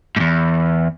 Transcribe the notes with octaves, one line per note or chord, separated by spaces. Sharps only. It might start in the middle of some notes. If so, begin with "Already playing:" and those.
E2 G#2